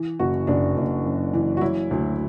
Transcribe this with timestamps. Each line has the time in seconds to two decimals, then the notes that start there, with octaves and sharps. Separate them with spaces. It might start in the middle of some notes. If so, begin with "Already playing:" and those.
Already playing: E3
0.19 F#1 F#4
0.47 F#1 D4
0.77 F#1
1.05 F#2
1.33 E3
1.57 F#4
1.61 F#3 E4
1.91 D2